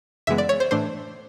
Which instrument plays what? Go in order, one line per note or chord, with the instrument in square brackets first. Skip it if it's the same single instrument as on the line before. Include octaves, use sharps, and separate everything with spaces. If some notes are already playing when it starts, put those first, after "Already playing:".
[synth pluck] F#2 C#3 E3 G#3 B3 E5
D5
C#5
C5
A2 E3 A3 D4 C5